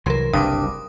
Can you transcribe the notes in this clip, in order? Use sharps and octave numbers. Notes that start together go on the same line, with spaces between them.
C2 E3 F#3 A#4 C6
F#1 C2 G2 D6 D#6